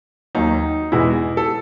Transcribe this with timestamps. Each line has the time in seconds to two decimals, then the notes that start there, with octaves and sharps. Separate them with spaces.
0.35 D#2 D#3 F#3 D#4
0.92 E2 B2 G#3 E4
1.37 A4